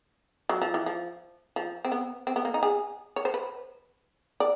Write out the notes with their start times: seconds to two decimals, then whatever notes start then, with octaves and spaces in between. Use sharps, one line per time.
0.49 F#3
0.62 F3
0.74 E3
0.86 F3
1.56 F3
1.85 C4
1.92 B3
2.27 C4
2.36 B3
2.45 A#3
2.54 D#4
2.63 G#4
3.16 C#5
3.25 C5
3.34 B4
4.40 D5